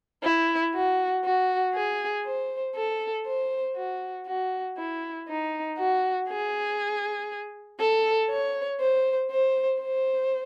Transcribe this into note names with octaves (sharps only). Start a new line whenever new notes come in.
E4
F#4
F#4
G#4
C5
A4
C5
F#4
F#4
E4
D#4
F#4
G#4
A4
C#5
C5
C5
C5